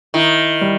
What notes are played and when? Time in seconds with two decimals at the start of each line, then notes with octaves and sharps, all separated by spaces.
0.14 D#3 E4
0.61 G3